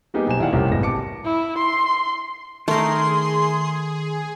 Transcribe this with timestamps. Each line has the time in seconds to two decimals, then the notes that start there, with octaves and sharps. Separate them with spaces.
0.14 G3 A#3 B3 D#4 G4 G#4
0.27 B1 C5 G#5 E7
0.39 A#1 D#3 E4 D5 F5 F#5
0.52 F1 C2 C#4 G4 A#4
0.72 G#1 B2 G3 E4 G#4 A#6
0.83 A5 D6 C#7
1.25 E4
1.58 C6
2.68 D#3 A3 G#4 A#4 C6